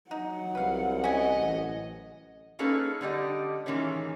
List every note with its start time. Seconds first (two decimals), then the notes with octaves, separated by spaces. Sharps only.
0.11 F#3 D#4 F#5
0.55 C2 B4 F5
1.04 C#4 D#5 G#5
1.37 A1
2.59 A#3 C#4 D#4 G#4 A4 B4
3.01 D3 G3 G4 D#5
3.66 A2 D#3 E3 G#3 A#3 C#4